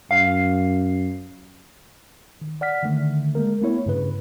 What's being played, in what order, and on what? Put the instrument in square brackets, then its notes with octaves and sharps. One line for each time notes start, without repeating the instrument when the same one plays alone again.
[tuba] F#2 [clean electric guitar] F5
[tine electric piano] D#3
D5 F#5 F6 B6
D3 D#3 A3
G#3 A#3 A#4
A3 B3 E4 C#5
G2 C#3 B4